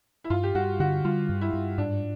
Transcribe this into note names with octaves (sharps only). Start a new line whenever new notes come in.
E4
G2 F4
G4
G2 F#4
D3 F#4
G3 F4
G2
E4
G2
G#2 D4